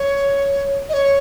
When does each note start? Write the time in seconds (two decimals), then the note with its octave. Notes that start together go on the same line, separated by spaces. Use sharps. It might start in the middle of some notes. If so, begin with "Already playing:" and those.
Already playing: C#5
0.89 D#5
0.94 C#5